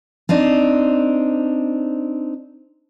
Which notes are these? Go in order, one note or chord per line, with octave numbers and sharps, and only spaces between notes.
C4 D4 D#4